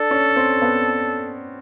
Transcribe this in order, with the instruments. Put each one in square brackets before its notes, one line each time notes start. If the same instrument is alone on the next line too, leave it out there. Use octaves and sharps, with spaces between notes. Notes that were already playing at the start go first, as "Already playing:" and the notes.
Already playing: [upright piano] D4 [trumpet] A4
[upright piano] C#4
C4
B3